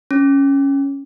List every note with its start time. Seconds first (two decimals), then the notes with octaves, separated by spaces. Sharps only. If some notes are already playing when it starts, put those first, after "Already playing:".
0.11 C#4